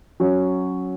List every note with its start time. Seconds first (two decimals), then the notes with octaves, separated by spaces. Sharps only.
0.20 F#3 C#4 F#4 C#5